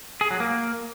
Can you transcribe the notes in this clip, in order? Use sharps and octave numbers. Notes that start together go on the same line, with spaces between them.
G#4
F#3
A#3